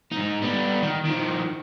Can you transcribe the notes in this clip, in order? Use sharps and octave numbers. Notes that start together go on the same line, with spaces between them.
G#2 D#4
G3 B3
D#3
D#3 F3